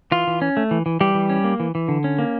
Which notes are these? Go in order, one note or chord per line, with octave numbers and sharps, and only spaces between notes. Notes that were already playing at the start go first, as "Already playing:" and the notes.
E3 F4
E3
C#4
A3
E3
E3
E3 G3 G4
E3
C#4
A#3
E3
E3
D3
C#4
A#3